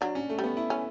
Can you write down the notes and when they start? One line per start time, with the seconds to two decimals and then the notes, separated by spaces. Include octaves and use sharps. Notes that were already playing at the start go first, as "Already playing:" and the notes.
0.01 F#3 D4
0.15 C#4
0.29 A3
0.39 G3
0.44 B3
0.57 E4
0.70 C#4